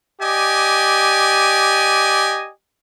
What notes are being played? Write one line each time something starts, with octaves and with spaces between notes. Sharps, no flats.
G4 D5 D#5 G#5